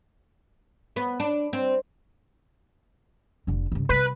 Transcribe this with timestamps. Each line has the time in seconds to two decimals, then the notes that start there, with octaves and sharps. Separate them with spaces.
0.96 B3
1.20 D4
1.53 C4
3.47 F1 D3
3.72 G2 C#3
3.89 C3 G3 B4